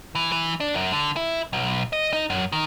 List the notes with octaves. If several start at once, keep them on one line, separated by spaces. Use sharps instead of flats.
E3
E3
D4
F#2
D3
E4
B1
D#5
D#4
F#2
D#3